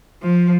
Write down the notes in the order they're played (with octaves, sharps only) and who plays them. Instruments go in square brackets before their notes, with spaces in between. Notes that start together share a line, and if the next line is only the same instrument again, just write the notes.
[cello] F3